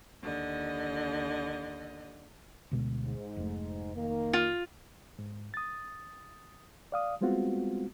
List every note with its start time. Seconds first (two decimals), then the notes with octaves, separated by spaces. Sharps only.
0.23 D#2 D3 D#5
2.72 D2 B2 G#3
3.05 G#2
3.37 F1 A3
3.96 D#3 A#3
4.33 F4
5.19 G#2
5.54 D#6 A6
6.92 D5 F5 D#6
7.21 G3 G#3 B3 C4 F4 F#4